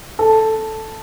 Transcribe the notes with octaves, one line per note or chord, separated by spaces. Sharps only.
A4